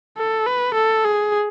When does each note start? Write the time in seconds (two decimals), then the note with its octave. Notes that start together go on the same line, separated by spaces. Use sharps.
0.18 A4
0.47 B4
0.75 A4
1.05 G#4